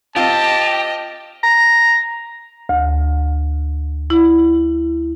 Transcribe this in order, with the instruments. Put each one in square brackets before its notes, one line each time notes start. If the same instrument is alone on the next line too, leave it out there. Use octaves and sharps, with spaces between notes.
[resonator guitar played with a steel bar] C4 F4 [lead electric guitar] G4 [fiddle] D#5 [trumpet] A5
[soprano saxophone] A#5
[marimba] D2
E4